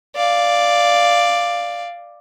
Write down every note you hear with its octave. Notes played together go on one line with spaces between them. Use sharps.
D5 F5